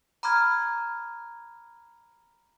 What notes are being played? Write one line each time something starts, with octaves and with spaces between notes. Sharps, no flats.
A#5 B5 D6 F6 G#6